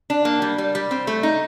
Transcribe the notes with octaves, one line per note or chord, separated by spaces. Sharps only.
D4
A#3
G3
G3
G3
C4
A3
D#4